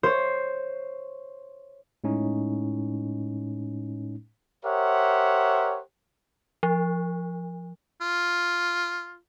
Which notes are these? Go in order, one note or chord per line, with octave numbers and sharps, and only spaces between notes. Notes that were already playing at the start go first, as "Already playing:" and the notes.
C5 C#5
A2 G#3 C#4 D#4
G4 A#4 C5 C#5 E5 F#5
F3
F4